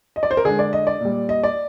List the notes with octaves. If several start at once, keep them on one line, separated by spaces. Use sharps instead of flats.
D#5
D5
C5
A#4
D3 G#3 G#4
D5
D#5
D5
A#2 G3
D#5
D5